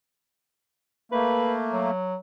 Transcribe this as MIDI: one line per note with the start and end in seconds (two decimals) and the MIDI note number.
1.12 1.91 57
1.12 1.91 58
1.12 1.53 71
1.72 2.16 54